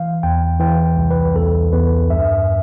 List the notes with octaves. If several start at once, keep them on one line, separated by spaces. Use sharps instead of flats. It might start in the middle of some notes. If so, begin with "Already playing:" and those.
Already playing: E3 F5
E2 G5
E3 G5
C2
B4
E2 A4
E2 B4
G2 E5